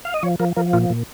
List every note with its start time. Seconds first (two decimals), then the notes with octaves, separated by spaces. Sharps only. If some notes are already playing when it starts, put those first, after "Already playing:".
0.05 F5
0.14 D#5
0.23 F3 C#5
0.40 F3 A#4
0.56 F3 A#4
0.73 A#2 F4
0.90 A#2